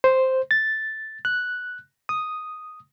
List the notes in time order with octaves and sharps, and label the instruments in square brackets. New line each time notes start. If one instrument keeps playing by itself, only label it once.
[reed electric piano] C5
A6
F#6
D#6